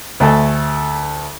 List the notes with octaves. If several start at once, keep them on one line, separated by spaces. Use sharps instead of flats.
D2 A3 A4 G#5